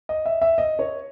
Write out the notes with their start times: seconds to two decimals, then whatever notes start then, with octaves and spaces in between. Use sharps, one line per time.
0.09 D#5
0.26 E5
0.42 E5
0.58 D#5
0.79 C#5